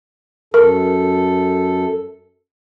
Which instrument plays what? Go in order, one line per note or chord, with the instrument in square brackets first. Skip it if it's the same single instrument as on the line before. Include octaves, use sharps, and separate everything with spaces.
[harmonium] F#2 A4 [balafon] A#4